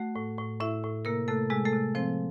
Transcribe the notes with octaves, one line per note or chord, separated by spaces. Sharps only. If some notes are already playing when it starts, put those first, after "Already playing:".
Already playing: A3 F#4 F#5
A2
A2
A2 E4 E5
A2
C3 A#3 A#4
C3 A3 A4
C3 G#3 G#4
A3 A4
C3
F3 C4 C5